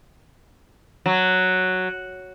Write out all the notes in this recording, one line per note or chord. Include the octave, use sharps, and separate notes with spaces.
F#3